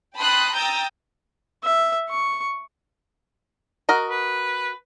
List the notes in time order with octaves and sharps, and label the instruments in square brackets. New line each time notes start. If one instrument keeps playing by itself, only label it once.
[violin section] G5 A5 B5 C6 D#6 F#6
G5 A#5 D#6 E6 G6 A6
[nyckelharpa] E5
C#6
[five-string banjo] F#4 A#4 D#5
[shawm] B4